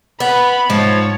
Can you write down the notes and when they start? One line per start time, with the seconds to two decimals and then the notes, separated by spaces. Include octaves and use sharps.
0.20 B3 B5
0.70 G#2 F3 C#5